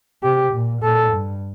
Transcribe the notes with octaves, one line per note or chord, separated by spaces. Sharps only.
C3 G4
A#2
A#2 A4
G2